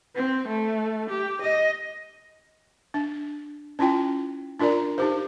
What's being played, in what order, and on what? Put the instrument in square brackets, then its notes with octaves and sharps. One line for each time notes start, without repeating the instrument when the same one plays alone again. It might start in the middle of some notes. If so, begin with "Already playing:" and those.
[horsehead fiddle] C4
A3
G4
D#5
[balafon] D4
C#4 E4 F4 G5
D4 F4 A#4 D5 A#5
D#4 G4 C5